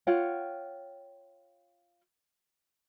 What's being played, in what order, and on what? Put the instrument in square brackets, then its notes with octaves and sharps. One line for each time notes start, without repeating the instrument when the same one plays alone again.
[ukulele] F4 C#5 F#5 G5